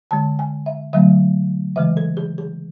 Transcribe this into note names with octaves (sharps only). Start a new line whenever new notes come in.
D3 G#3 A5
G#5
E5
D3 F#3 A3 E5
C#3 E3 G#3 E5
A4
G#4
G#4